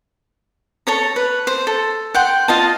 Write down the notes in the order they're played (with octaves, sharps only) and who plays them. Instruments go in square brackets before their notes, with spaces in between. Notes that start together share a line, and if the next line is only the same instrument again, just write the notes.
[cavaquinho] A4 C#5 A#5
B4
C5
A4
F#5 G5 C6
F4 D#5 A5